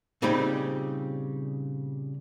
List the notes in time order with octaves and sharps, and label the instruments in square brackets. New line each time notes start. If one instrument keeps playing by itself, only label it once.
[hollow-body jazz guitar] A#2 C#3 G3 C4 D#4 B5